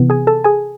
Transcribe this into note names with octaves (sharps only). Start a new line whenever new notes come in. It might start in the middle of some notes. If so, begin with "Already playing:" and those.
Already playing: C3 E3 B3
G#4 G#5
A4 A5
G#4 G#5